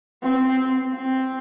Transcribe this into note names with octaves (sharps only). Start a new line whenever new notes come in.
C4
C4